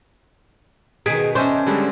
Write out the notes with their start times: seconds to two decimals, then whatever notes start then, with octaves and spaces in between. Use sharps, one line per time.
1.06 B2 D#3 G#4 G#6 B6 D7
1.35 C#4 D4 C5 D#5 E5 C#6
1.67 D3 G3 G#3 E4